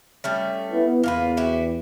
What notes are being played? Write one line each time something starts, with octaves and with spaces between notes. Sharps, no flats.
G3 A3 C#4
B3 E4
E2 A#3 F4 B4
E4 F#4 G4